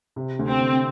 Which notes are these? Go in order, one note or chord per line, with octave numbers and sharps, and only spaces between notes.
C3
D2
C4
D2